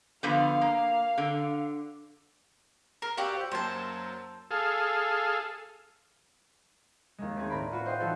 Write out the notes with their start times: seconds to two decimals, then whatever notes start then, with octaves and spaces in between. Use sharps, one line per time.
0.23 D3 F3 B3 F5
0.61 A#3
1.18 D3
3.02 A#4 A#5
3.17 F#4 G4 D5 F5 E6
3.36 C5 G6
3.52 F#2 F#3 A#3 C5 A5
4.51 G#4 A4 F5
7.18 D#2 D#3 G#3
7.36 A3 C4 D#4 G#4
7.50 A2 A#4 D5 A#5 B5 D7
7.72 F4 F#4 B4
7.86 C5 D#5 F5 G5
8.00 E3 F3 D#4 F#4 A4